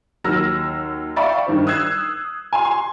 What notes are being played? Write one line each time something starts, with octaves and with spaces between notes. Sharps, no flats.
D#2 F#3 E6 F6 A#6
D5 E5 F5 G5 B5 C#6
G2 D#3 C5
D#6 E6 F#6 G#6 C7 E7
G#5 C6
C6